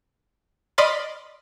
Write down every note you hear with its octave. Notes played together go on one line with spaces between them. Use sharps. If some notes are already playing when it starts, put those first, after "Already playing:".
D5 D#5 B5 C6 F6 A6